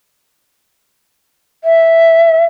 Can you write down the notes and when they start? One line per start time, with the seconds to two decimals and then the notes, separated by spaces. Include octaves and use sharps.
1.64 E5